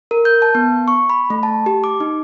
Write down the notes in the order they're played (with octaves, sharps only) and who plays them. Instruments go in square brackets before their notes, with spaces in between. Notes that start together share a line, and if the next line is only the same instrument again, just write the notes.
[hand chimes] A#4
G6
A5
B3
C#6
B5
A3
A5
G4
D6
D#4